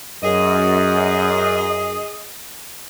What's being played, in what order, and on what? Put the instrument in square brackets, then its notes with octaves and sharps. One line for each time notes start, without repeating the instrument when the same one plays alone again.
[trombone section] F#2 [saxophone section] G#4 D#5